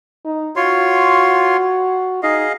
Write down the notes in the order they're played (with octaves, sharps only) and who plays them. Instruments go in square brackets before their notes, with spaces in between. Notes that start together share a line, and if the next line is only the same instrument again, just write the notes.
[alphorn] D#4
[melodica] F4 C#5 C6 [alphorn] F#4
[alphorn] D#4 [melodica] G#4 D#5 F5